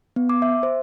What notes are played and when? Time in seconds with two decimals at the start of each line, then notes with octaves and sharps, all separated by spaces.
0.16 B3
0.29 D6
0.42 E5
0.63 C5